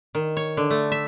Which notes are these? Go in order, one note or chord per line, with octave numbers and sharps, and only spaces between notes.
D#3
C#5
D3
A3
E5